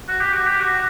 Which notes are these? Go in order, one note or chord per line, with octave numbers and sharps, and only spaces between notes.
F#4
G4
F#4
G4
F#4